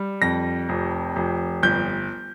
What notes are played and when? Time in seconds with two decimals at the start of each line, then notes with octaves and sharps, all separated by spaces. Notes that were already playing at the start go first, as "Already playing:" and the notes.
Already playing: G3
0.22 F2 A#6
0.69 F1
1.16 F1
1.63 G1 G6